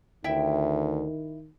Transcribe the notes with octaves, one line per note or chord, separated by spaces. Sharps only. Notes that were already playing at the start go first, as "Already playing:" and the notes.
D2 D#3 E4 E5 G5